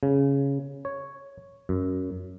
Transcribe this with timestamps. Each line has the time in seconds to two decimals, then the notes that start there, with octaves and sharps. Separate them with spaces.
0.03 C#3
0.85 C#5
1.69 F#2